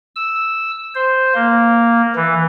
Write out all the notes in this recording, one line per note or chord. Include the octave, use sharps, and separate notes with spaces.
E6
C5
A#3
E3